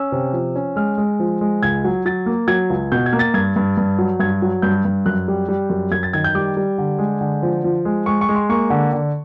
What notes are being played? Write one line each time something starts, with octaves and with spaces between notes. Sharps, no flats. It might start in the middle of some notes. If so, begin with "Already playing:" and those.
Already playing: C#4 E6
C3
F3
C#4
G#3 F6
G#3
F3
G#3
C#2 G#6
F#3
F#3 A6
A#3
F#3 G#6
C#2
B2 G6
G#6
A#3
A6
G2 G#6
G2
G2
F#3
G2 G#6
F#3
G2 G6
G2
F#2 F#6
G3
G3
F#2
F#2 G#6
A6
D#3 G#6
G6
G3 D6
G3
D3
G#3
D3
F3
F3
G#3
G#3 C#6
C#6
G#3
C6
A#3 C#6
D3
D3